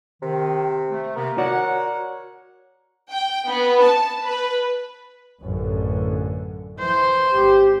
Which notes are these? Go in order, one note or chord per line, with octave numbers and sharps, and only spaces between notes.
C3 D#3
A3
C3 A#3 B3 A#4
F#4 C#5 D5 F#5
G5
B3
A5
B4
A1 F#2 D3
E3 C5
G#1 G4